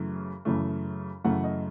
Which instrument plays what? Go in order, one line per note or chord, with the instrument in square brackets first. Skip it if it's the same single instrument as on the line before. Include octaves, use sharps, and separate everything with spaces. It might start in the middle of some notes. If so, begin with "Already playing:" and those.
Already playing: [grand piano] F#2 C#3 E3 A3
F#2 C#3 E3 A3
F#2 C#3 E3 A3 F#5
D#5